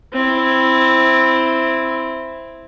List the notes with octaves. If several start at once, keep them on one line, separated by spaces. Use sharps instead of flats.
C4 E4